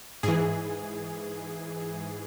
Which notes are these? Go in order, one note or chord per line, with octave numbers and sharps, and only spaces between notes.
G#2 E3 G#4